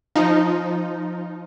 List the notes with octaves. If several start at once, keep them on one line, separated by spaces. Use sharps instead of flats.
F3 D#4